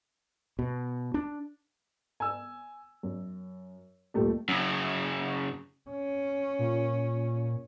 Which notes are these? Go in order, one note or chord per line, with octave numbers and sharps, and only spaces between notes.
B2
D4
G#5 E6
F#2
D#1 A#2 A3 G4
F#2 C#3
C#4
A#2